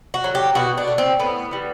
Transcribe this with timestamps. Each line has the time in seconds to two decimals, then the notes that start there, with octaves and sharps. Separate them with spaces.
0.14 F#4
0.24 F#3 A3
0.35 G4
0.55 B2 F#4
0.77 D4
0.88 A3
0.98 C4
1.19 A2 B3
1.51 E3 G3